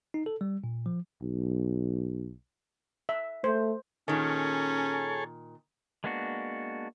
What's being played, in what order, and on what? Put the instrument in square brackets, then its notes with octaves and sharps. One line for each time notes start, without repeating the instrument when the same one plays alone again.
[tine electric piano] D#4
A4
G3
A#2
F3
[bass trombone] B1
[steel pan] E5
[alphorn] A3 [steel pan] C5
[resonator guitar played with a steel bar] A#2 D#3 [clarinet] C#4 [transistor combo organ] G#4 A4 C#5
[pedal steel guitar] G#3 A#3 B3 D4 F#4